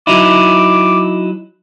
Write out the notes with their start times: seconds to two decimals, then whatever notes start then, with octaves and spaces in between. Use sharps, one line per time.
0.07 F#3 D#4 E4 D6